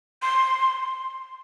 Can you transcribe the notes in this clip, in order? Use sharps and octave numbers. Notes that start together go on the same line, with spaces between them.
C6